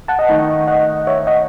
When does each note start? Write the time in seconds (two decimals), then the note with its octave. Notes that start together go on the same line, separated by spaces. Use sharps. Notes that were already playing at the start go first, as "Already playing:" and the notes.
0.08 F#5 A5
0.19 D#5 F#5
0.28 D#3 A3 D#4
0.67 D#5 F#5
1.07 C#5 E5
1.27 D#5 F#5